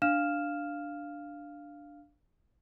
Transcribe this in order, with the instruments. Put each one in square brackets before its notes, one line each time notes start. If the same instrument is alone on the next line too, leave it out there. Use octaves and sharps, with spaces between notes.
[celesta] D4 F5 F6 E7